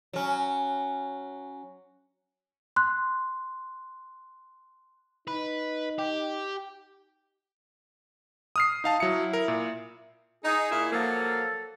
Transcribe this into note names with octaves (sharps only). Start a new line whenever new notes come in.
F#3 C#4
C6 F#6
D#4 B4
G4
D#6 F6 C7
D#4 F5 A5
F#3 E4 C#7
A#4
A#2
D#4 G#4
A#2 E4
F3 F#3 A#3 A4